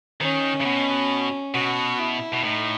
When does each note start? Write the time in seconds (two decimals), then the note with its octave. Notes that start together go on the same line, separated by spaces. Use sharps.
0.20 D#3 C#4
0.61 C#3
0.65 B2
1.54 B2 F#4
1.99 E4
2.32 B2
2.43 A2 D#4